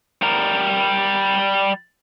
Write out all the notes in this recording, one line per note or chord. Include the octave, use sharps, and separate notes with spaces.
G3 A#4